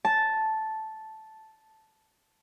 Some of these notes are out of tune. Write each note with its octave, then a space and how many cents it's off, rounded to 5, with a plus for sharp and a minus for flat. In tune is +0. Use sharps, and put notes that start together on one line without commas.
A5 -5